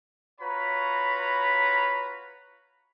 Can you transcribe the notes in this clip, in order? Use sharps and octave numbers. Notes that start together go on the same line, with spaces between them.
F4 F#4 B4 C#5 A#5 B5